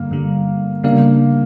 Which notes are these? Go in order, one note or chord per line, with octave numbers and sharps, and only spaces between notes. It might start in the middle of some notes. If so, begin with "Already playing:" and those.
Already playing: G2 D3 G3 A#3
G2 D3 G3
C#3 G3 A#3 D4